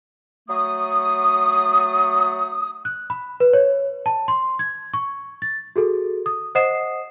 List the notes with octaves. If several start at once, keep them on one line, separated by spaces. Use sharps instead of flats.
F#3 A3 D#6
F#6
B5
B4
C#5
A5
C6
G#6
C#6
A6
F#4 G#4 A4
D#6
C5 D#5 F#5 D#6 C7 E7